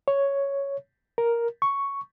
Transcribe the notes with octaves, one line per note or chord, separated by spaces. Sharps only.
C#5
A#4
C#6